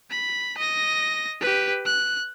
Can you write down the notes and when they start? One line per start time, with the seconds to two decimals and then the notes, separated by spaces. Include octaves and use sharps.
0.11 B5
0.58 D#5 A#6
1.41 G4 B4
1.86 F#6